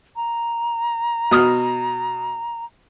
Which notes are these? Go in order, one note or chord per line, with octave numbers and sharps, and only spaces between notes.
A#5
B2 D#6 F6